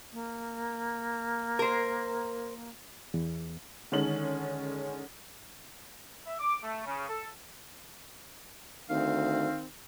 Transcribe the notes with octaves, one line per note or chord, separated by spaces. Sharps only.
A#3
A#4 C5
E2
D3 D#3 G#3 C#4 F#7
E5
D6
A3
C#3
A4
D2 D#3 C4 F5